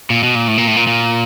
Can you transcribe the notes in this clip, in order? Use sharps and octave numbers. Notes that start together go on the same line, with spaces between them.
A#2
B2
A#2
A2
A#2
A2
A#2
A#2